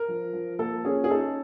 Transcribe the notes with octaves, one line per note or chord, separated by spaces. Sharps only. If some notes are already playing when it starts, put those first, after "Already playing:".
Already playing: A#4
F3
F3
A#3 A4
C#4 G#4
G#4
D#4 A4